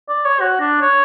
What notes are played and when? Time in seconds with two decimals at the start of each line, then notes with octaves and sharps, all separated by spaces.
0.09 D5
0.25 C#5
0.41 F#4
0.60 D4
0.82 C#5